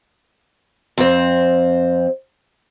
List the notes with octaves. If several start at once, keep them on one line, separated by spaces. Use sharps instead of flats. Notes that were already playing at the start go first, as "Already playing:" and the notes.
F2 C4